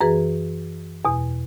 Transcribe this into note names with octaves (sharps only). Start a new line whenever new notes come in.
F#2 E3 G#4 B4
E2 B2